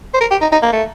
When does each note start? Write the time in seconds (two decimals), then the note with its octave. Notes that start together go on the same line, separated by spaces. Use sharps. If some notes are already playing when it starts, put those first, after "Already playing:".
0.14 C5
0.21 A#4
0.31 G4
0.42 D#4
0.52 D#4
0.63 A#3
0.73 A3